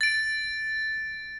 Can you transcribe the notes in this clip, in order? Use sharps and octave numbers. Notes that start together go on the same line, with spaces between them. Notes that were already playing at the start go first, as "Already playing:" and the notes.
A6 D7